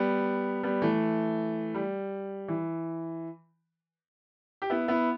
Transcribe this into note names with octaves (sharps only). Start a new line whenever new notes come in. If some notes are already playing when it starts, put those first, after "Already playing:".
Already playing: G3 B3
G3 B3
E3 A3
G3
E3
G4
B3 E4
B3 E4